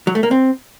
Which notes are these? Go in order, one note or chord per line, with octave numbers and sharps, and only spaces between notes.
F#3
A3
A#3
C4